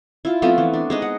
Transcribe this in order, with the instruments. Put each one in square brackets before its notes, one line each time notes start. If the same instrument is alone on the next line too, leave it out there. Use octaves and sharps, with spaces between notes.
[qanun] E4 F4
F3 A3 B3 C4
E3
D4
G#3 D#4 D#5
F#5